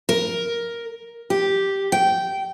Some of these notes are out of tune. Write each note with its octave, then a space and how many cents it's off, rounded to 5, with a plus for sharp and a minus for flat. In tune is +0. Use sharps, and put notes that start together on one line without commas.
A#4 +5
G4 -5
G5 -15